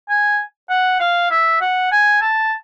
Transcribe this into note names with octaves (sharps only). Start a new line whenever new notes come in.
G#5
F#5
F5
E5
F#5
G#5
A5